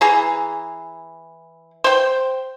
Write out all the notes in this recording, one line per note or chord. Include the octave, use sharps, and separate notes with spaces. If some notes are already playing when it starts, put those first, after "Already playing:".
E3 G#4 A#5
C5 G5